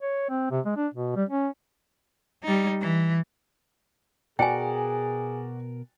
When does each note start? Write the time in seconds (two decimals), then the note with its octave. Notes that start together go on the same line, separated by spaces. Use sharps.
0.01 C#5
0.29 C4
0.51 C3
0.65 G#3
0.76 D4
0.94 B2
1.16 G3
1.29 C#4
2.44 G3 D#4
2.81 E3
4.39 B2 F#4 G#4 A#4 D5 G5 G#5